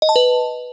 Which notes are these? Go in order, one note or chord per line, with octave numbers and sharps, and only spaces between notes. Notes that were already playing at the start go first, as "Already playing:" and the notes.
D#5
A5
B4